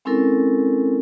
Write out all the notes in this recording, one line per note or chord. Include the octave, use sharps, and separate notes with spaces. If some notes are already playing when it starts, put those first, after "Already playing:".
G#3 C4 C#4 E4 A4 A#4